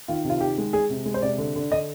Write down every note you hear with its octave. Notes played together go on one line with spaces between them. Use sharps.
D#3 F4
C3
F4
D#3 G4
G#3
G#3 G#4
C3
G#3
C5
C3 D5
D3
D3
D3 D#5